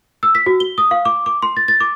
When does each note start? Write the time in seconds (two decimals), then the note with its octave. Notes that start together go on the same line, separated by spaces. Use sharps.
0.23 E6
0.35 B6
0.46 F#4
0.60 G7
0.78 D#6
0.91 F5
1.05 D6
1.26 D6
1.42 C6
1.57 A6
1.68 A6
1.80 D6